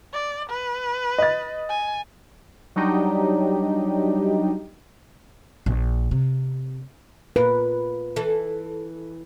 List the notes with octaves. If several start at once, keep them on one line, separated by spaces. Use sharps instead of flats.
D5
B4
D#5 A6
G#5
F#3 G3 D4 D#4 G4
A#1
C3
A#2 F4 A#4 B4
E3 A4